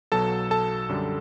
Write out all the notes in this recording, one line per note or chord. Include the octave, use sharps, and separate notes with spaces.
B1 B2 F#3 A4 A5
A4 A5
F#2 D3 G3